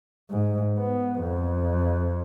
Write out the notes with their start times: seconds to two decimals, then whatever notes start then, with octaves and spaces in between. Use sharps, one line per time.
0.30 G#2
0.79 B3
1.21 F2